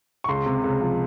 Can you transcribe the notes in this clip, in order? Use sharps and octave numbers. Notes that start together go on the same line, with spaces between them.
C#6
C#2 C6
C3
C#2
F3